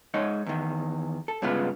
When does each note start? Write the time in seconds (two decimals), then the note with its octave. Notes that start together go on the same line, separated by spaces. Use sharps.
0.14 G#3 D#4 C#5 D#5
0.46 E2 D#3
1.28 A4
1.42 G2 C#3 G#3 B3 F4